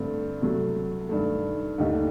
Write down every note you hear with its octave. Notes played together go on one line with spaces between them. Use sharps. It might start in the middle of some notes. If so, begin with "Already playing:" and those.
Already playing: G2 D3 A3 C4
C3 F#3 A3
G2 D#3 A3
D#2 D3 A3 D#4 G4